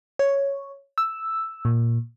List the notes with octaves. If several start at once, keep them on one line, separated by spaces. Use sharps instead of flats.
C#5
E6
A#2